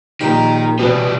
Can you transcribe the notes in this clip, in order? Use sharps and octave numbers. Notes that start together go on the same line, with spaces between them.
A#1 D#3 G4 A#4
B2 E3 G3 B3